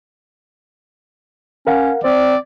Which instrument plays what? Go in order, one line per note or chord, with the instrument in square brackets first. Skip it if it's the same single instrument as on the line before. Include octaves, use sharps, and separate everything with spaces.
[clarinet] C#4 [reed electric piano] A#4 F5 F#5
[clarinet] C4 [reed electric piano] C5 [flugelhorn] D5